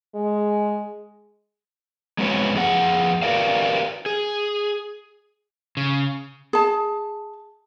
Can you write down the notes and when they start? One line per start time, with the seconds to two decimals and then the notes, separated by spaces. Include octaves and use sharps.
0.15 G#3
2.18 G#3 B3 C4 F#4 B4 C#5
2.55 F2 G#4 F#5
3.22 F#4 G4 A#4 B4 D5 F5
4.06 G#4
5.77 C#3
6.53 G#4 A5